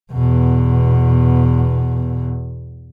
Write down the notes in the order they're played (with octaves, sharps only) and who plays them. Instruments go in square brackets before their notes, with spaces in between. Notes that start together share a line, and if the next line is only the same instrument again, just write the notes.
[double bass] E2 B2